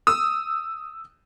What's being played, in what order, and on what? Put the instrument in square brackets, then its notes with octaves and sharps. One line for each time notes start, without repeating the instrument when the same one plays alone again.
[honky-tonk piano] D#6 E6